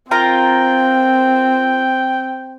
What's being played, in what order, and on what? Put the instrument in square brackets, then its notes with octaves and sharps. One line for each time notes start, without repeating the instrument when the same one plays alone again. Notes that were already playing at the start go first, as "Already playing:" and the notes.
[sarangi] C4 [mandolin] F4 A#4 A#5 [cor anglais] G5